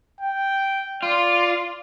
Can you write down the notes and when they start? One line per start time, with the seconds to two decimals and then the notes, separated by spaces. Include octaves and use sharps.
0.20 G5
1.03 F4 D5